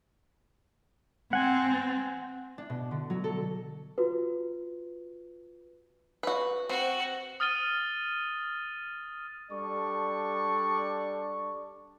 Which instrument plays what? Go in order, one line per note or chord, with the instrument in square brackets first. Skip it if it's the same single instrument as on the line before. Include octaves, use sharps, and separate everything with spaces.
[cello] C4 [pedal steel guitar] F#5 G#5
[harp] D4
B2
D3
F#3
A4
[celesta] F4 F#4 B4
[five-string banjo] F#4 B4
[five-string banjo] C4 [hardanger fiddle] F#4 C5
[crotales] D#6 F6 A6 D#7 G7
[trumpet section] G3 D4 A4 D5 C#6